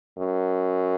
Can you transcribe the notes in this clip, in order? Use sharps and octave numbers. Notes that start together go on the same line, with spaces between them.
F#2